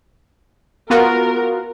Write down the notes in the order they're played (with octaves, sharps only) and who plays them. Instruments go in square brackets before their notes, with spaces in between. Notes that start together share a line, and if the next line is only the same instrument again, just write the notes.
[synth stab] B3 F4 F#4 [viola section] A#4